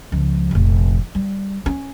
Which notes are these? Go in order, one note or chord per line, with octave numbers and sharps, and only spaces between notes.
C#2 F3
F1 A#1
G3
C#4